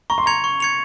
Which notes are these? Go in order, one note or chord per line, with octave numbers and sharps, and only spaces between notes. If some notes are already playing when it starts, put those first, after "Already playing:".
A#5 C#6
C6
A#5 G#6 C#7 F7
C#6
G#6 C#7 F7